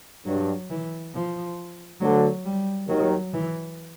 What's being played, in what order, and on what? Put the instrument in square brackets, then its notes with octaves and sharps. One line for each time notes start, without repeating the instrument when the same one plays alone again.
[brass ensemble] G2 [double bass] F#3
[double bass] E3
F3
[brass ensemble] D2 D3 [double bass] F#3
[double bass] G3
[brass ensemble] D#2 D#3 [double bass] F#3
[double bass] E3